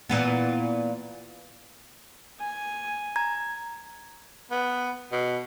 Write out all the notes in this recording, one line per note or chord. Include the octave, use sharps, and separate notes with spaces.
A#2 E3 B3
G#5
A#5 G#6
B3
B2